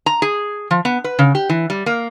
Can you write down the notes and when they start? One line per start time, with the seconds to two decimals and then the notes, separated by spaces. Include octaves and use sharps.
0.06 A#5
0.22 G#4
0.71 F3
0.85 B3
1.04 B4
1.19 C#3
1.35 G4
1.49 E3
1.70 G3
1.86 A#3